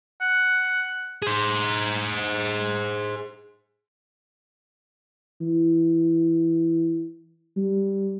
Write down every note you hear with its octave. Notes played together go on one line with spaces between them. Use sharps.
F#5
G#4 C5
E3
G3